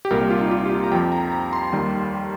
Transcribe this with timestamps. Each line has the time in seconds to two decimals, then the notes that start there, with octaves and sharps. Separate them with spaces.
0.05 G4
0.10 C2 A#2 G3 A#4
0.21 G4
0.31 F4
0.41 D#4
0.51 F4
0.66 G4
0.71 F4
0.84 A#5
0.92 F2 G5
0.95 F3
1.12 A#5
1.32 A#5
1.53 C6
1.73 D#2 D#3 G3